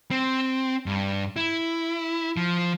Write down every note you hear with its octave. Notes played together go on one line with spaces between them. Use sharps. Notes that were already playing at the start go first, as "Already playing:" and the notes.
C4
G2
E4
F3